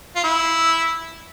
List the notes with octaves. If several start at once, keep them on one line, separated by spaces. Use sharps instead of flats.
F4
E4